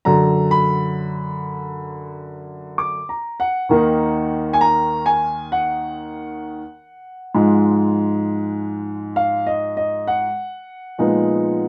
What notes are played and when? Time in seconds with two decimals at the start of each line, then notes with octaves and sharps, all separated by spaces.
0.05 F#2 D3 F#3 A#5
0.51 B5
2.78 D6
3.09 A#5
3.40 F#5
3.69 D#2 D#3 A#3 D#4
4.53 G#5
4.61 A#5
5.06 G#5
5.52 F#5
7.35 G#2 F3 G#3
9.16 F5
9.47 D#5
9.77 D#5
10.08 F#5
10.98 A#2 F3 G#3 B3 D#4